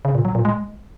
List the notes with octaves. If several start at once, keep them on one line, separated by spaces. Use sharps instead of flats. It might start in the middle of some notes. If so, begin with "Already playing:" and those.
C#3
A#2
F#3
A#2
G#3